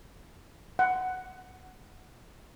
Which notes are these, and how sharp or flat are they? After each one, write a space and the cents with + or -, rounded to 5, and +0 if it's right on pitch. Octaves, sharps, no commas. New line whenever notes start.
F#5 +5